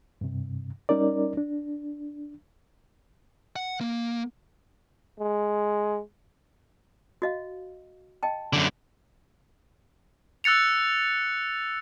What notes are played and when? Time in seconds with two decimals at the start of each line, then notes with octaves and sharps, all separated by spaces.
0.21 G2 C3
0.89 G3 C#4 D#4 A#4 D5
1.37 D4
3.56 F#5
3.81 A#3
5.20 G#3
7.22 F#4 D#5 F5
8.23 D#5 G5 A5
8.53 F#2 D3
10.44 E6 F#6 A6 C#7 F7